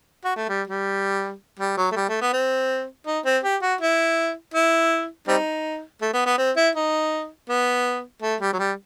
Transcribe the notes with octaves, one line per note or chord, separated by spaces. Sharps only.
F#4
A3
G3
G3
G3
F#3
A3
G3
A3
B3
C4
D#4
C4
G4
F#4
E4
E4
G3 C4 D#4
A3
B3
B3
C4
E4
D#4
B3
A3
G3
F#3
G3